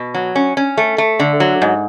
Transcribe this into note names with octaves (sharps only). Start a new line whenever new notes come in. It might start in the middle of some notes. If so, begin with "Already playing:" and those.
Already playing: B2
F#3
C#4
C#4
A3
A3
D3
F#3
G#2